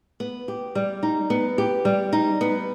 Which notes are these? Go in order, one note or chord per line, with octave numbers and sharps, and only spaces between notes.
B3
G4
G3
D#4
B3
G4
G3
D#4
B3